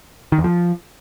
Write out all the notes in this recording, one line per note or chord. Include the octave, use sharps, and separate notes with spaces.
D#3
E2
F3